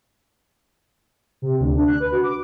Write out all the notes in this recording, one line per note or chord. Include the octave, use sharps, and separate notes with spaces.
C3
D2
D4
F#6
B4
F#4
D6